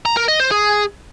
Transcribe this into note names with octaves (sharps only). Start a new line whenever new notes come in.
A#5
A#4
D#5
C5
G#4